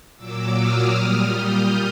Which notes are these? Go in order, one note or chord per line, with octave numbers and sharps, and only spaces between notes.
A#2 F#3 D6 E6
D#6 F6
A#2 G3
F6 G6